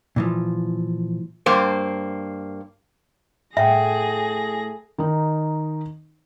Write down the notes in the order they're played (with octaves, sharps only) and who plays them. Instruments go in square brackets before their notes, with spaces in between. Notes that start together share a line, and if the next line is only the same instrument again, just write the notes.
[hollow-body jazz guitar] A#2 E3 F3
[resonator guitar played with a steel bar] G2 A#3 C5
[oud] A2 [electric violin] G#4 A#6 [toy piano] E5 [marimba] F#5 G5
[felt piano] D#3 D#4